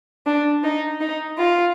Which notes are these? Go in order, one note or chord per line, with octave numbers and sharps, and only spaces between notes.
D4
D#4
D#4
F4